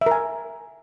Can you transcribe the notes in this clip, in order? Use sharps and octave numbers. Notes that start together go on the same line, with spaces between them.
A#4 E5 G#5